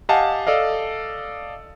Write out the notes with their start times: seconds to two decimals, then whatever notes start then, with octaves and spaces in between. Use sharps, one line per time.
0.09 G4 D#5 F5 F#5 G#5 A5
0.47 A4 D5 D#5 F5